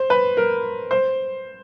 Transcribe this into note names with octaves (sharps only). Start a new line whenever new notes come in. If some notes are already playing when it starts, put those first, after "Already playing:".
Already playing: C5
B4
A#4
C5